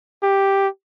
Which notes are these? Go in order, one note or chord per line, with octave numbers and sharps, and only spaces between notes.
G4